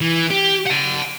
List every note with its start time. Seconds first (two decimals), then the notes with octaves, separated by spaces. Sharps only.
0.01 E3
0.30 G4
0.66 F#5 A5